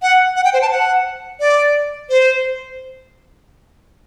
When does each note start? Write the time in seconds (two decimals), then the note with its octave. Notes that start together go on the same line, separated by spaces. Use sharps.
0.02 F#5
0.36 F#5
0.45 G5
0.53 C5
0.62 A5
0.71 F#5
1.40 D5
2.10 C5